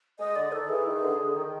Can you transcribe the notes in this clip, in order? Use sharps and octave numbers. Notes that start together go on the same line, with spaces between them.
G#3 D#5
D3 D5
D#3 A4
E3 G#4
D#3
D3
D3
D#3